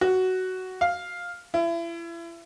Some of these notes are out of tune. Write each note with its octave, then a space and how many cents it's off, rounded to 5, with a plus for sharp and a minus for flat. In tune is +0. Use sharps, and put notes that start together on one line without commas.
F#4 +10
F5 +5
E4 +35